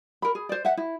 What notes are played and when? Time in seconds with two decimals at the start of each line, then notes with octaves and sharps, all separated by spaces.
0.22 A#4 B5
0.35 G#4
0.49 C5 D5
0.65 E5 F#5
0.77 E4